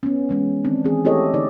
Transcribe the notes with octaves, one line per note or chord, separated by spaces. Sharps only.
B3 C#4
E3 G#3 C#4
D#3 C4 D4
E3 C4 G#4
A3 E4 G4 A4 C#5 D#5
D3 D#4 D5